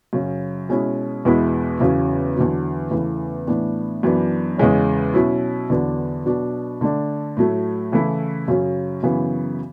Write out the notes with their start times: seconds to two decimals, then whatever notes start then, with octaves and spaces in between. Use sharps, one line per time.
0.13 F#2 C#3 F#3 C#4
0.69 B2 G#3 C#4 E4
1.25 E2 B2 G#3 B3 E4
1.80 E2 C#3 F#3 C#4
2.36 E2 D3 F#3
2.91 E2 C#3 E3 A3
3.47 A2 E3 B3 D4
4.03 F#2 E3 B3 D4
4.58 E2 C#3 G#3 C#4
5.13 B2 F#3 C#4 E4
5.70 E2 D3 F#3 B3 D4
6.26 B2 F#3 B3 D4
6.81 D3 A3 D4
7.37 A2 F#3 A3
7.92 C#3 E3 A3 E4
8.48 F#2 C#3 F#3 C#4
9.03 F#2 C#3 E3 B3